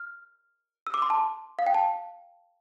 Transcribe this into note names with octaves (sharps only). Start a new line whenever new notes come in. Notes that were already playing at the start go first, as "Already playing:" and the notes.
Already playing: F6
E6
D6
C6
A5
F5
G5
A5